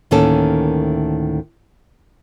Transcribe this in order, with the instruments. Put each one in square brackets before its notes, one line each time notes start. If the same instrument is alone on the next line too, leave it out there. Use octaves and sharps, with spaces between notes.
[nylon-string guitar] D2 A2 D#3 A#3 C#4 A4